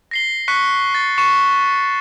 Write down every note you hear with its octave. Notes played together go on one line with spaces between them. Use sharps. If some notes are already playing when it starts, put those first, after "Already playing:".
A#6 C7 G7
C#6 F#6 B6 C#7
A6
C#6 C#7 E7